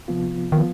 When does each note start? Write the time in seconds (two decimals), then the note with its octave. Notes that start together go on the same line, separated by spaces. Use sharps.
0.08 C3 F3 B3 F4
0.52 D#3 F3 B3 F4